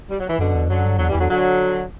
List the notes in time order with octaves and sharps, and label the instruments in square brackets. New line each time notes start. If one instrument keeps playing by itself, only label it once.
[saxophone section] G3
F#3
E3
[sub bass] F#2 [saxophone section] B2 D3
[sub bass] E2
[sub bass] F#2 [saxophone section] D3 F#3
[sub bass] G2
[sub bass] E2 [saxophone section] D3 F#3
[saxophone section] E3 G3
[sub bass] E2 [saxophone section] D3 F#3
[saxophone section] D3 F#3